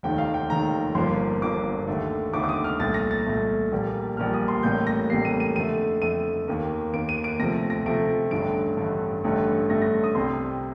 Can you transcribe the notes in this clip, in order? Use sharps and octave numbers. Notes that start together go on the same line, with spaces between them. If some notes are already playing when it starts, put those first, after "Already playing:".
F1 D#2 D#3 G5
F5
G5
F1 D#2 D#3 A#5
G1 G2 F3 A#3 C6
G1 G2 F3 A#3 D6
D#2 D3 A3
D#2 D3 A3 D6
D6
D#6
F6
C2 A#2 A3 A6
A#6
A6
C2 A#2 A3
A#1 A#2 G3 A#3
A#1 A#2 G3 A#3 F6
D#6
C6
A1 A2 G3 A#3 G6
A#6
A1 A2 G3 A#3 C7
D#7
D#7
F2 D3 A3 D#7
F2 D3 A3 D#7
D#2 D#3 A#3
D#2 D#3 A#3 D7
D#7
D7
D2 C3 F3 A3 A#6
A#6
D2 C3 F3 A3 D7
A1 G2 D3 A3 D7
A1 G2 D3 A3
A1 G2 D3 A3
A1 G2 D3 A3 A#6
A#6
D#6
C2 C3 G3 C6